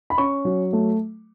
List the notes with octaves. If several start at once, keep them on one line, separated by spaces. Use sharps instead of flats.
B5
C#4 C#6
F#3
A3